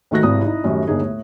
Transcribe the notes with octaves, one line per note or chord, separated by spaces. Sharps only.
D2 D#3 A3 F#4 F#6 A#6
G#1 C3 G3 E4 D#6
D#4 E4
F#2 A2 D#3 G3
G1 D#2 D3 A#3 D#4 G#4
A2